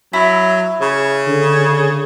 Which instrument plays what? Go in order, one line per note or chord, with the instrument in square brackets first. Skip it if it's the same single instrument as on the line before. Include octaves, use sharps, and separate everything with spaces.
[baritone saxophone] F#3 [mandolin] E4
[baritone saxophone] C#3
[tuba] D3